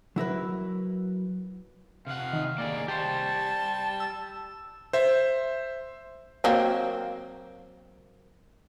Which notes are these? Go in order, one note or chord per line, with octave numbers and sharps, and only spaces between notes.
F#3 E4 A#4 B4
C3 F5 F#5
D#3
A#3 G#4 D5
G3 G4 C5 A5
E6
C5 E5
F#3 A#3 C4